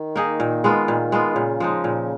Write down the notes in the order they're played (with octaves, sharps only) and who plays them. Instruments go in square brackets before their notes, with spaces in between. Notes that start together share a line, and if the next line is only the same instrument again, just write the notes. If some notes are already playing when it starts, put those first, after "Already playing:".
Already playing: [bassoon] D#3
[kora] A#3 D#4 G#4
A#2
G#3 B3 F4
A#2
G#3 B3 F4
[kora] A#2 [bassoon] C#3
[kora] F3 G#3 D#4
A#2